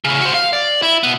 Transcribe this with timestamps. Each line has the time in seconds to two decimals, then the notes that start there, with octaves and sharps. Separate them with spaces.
0.04 A2 C#3
0.21 F#4 C5
0.34 F5
0.53 D5
0.82 E4
1.03 B2 B3